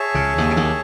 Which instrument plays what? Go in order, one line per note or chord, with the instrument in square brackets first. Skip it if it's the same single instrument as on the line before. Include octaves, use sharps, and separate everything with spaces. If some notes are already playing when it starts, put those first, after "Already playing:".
Already playing: [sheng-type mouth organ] G#4 C#5 E5 A5
[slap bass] C#2 C#3
D#2 D#3
C#3
D#2 D#3